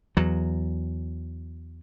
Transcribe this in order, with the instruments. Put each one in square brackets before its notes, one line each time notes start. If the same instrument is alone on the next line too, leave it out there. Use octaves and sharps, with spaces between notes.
[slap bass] E2 F#3